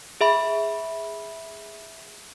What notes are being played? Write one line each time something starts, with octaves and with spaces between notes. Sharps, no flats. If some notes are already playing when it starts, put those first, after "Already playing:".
G#4 E5 B5